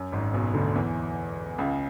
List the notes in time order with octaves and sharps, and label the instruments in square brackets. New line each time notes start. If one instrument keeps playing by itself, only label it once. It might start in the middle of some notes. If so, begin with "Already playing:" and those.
Already playing: [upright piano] F#2
G#1 G#2
B1 B2
D2 D3
E2 E3
C#2 C#3